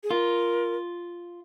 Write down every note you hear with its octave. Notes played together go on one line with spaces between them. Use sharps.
G#4
F4 A#4